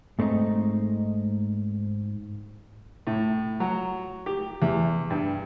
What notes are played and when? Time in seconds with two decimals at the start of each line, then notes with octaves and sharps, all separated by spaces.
0.19 G#2 A3 C4 D4 D#4
3.07 A2
3.60 F#3
4.26 G4
4.62 E2
5.10 G2